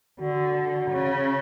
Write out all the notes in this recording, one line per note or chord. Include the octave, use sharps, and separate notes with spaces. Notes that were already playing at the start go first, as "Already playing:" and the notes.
D3 F#4
C#3